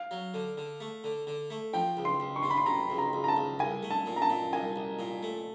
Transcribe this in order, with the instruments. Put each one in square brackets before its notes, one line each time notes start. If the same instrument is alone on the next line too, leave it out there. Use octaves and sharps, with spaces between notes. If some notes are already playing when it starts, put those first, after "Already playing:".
Already playing: [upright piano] F5
[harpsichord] F#3
D3
D3
A3
D3
D3
A3
[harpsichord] F3 [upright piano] G5
[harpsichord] C#2
[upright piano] C6
[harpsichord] C#2
[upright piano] C#6
[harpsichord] C3 [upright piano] C6
[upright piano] B5
C6
[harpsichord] C3 [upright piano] A#5
[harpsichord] C#2
[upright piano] A#5
[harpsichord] C#2
[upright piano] A#5
A5
[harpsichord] C#2
[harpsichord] C2 [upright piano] G#5
[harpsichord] A3
[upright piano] A5
[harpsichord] A#2
[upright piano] A#5
A5
[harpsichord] A#2
[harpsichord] C2 [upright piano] G#5
[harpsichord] C2
A#2
A3